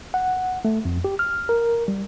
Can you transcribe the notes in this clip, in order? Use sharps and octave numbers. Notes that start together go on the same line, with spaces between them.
F#5
A3
F2
G4
F6
A#4
G3